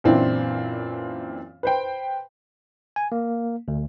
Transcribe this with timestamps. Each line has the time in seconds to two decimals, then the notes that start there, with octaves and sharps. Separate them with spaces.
0.04 F#2 A#2 E3 C4 D4 E4
1.63 B4 C5 G5
2.96 G#5
3.12 A#3
3.68 D2